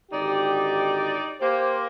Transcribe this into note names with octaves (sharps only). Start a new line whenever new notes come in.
G#1 D3 D#4 G4 D5
A#3 G4 C5